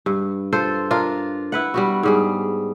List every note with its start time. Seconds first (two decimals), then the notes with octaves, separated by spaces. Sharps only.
0.06 G2
0.52 F4 A4 C5
0.91 D4 F4 A#4
1.52 E4 B4 F#5
1.74 G3 B3 F#4
2.03 G#2 G3 G#4